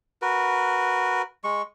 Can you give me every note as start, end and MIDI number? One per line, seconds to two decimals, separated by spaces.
0.22 1.22 66
0.22 1.22 70
0.22 1.22 71
1.44 1.62 56
1.44 1.62 85